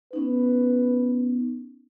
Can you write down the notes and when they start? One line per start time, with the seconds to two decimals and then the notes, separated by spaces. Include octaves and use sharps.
0.13 B3 C#4 D#4 B4